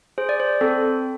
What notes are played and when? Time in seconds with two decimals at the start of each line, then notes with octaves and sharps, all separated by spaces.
0.18 G#4 C5
0.29 D5
0.40 C5
0.61 C4 A4